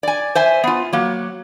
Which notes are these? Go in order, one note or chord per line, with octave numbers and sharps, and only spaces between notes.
D5 G#5
C5 E5 G#5
B3 F4
F#3 A#3